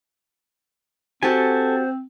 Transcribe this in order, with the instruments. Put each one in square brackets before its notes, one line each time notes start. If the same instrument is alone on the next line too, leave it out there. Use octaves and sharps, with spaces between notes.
[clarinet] C4 [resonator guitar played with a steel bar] F#4 G4 [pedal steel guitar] A4 G#5 [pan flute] C5